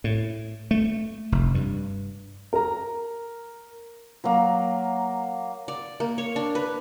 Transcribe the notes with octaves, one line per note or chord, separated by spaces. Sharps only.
A2
A3
F1
G2
A#4 A#5
F#3 A#3
D5
A#3
C#5
D4
B4